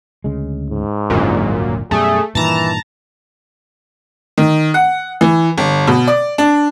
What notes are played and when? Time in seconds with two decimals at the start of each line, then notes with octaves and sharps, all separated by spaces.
0.24 D2 C#3 G#3
0.70 G#2
1.10 D#1 G#1 F#2 A#2 D3
1.91 F#2 B2 G3 A3 G#4
2.35 G2 A#2 D#3 E3 A5 A#5
4.38 D#3
4.74 F#5
5.21 E3
5.58 G1
5.87 B2
6.07 D5
6.38 D4